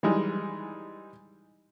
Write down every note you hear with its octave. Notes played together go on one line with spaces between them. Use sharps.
E3 G3 G#3 D#4